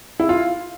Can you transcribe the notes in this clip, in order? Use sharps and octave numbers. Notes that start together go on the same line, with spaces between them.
E4
F4